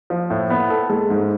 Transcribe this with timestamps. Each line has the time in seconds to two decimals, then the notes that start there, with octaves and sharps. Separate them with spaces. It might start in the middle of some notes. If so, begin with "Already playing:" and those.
0.10 F3
0.30 A2
0.50 B3
0.70 A4
0.90 G#3
1.10 G#2